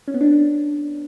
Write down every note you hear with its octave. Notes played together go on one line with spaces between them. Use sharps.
C#4
B3
D4